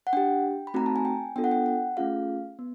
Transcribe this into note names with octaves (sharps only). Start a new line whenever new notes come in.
F#5
D4 G4 G5
B5
A3 C4 D#4 F#4 A#5
A5
G#5
G5
B3 D4 F4 A4 G5
F#5
G5
F#5
A3 C#4 F4 G#4 F5
B3